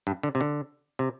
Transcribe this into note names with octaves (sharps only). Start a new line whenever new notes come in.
G2
D3
C3
D3
C3